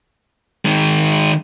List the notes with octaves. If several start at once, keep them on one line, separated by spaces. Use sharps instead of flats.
D#3 G#3